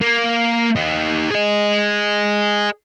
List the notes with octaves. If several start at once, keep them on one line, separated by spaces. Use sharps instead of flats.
A#3
D#4 G4
G#4 D#5